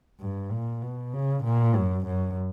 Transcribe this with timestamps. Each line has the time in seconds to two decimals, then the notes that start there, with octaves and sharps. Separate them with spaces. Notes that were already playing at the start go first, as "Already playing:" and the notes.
0.20 G2
0.51 A#2
0.82 B2
1.13 C#3
1.44 A#2
1.75 F#2
2.06 F#2